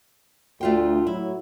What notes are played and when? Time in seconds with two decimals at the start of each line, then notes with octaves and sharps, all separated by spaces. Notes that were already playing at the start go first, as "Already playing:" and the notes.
0.61 D2 A3 F4 G5
1.07 A2 F#3 E4